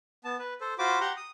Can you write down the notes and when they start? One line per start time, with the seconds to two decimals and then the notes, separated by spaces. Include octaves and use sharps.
0.24 B3 A5
0.39 B4
0.61 A4 C5
0.79 F4 F#4 C5 B5 D6
1.00 G4 F#5 A#5 C6
1.17 D#6